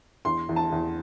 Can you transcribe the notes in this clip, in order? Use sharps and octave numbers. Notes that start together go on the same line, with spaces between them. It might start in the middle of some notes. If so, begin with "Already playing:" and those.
E2 C6
E2
A5
E2